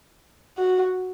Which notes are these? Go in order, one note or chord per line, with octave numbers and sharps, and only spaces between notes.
F#4